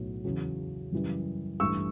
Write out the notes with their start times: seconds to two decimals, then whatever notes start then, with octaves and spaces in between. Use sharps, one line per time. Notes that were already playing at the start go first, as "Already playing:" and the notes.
Already playing: B1 A2 F#3 B3
0.24 E2 C#3 F#3
0.92 F#2 C#3 E3 G3
1.60 A1 G2 E3 A3 C#6 E6